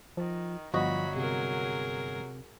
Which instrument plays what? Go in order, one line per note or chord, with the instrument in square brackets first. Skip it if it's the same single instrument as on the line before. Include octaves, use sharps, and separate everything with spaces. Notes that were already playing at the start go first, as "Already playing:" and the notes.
[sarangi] D#3 [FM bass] F3
[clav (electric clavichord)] G1 F#4 D#5 [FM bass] F3 [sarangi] F#3 [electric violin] B5
[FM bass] C3 [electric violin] G#4 A#4